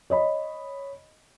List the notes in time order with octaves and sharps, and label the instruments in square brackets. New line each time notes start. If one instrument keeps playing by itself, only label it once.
[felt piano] C#5 D#5 B5